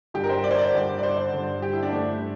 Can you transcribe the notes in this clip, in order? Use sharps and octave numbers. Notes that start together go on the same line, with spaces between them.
G2 D3 G4
A#4
C5
D5
C5
D5
G2 D3
D5
C5
G2 D3
G4
E4
D4
G2 D3 A3